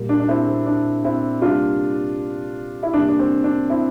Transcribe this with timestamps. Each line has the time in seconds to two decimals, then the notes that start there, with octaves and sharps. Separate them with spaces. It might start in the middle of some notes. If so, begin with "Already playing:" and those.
Already playing: A#2 G3 A#3
0.09 D4
0.20 D4
0.28 C4 E4
0.48 C4
0.66 D4
1.04 C4 E4
1.42 C3 G3 A#3 D4 F4
2.83 E4
2.93 C3 G3 A#3 D4
3.08 D4
3.19 C4
3.44 D4
3.69 C4 E4